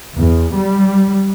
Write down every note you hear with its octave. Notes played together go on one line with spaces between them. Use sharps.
E2
G3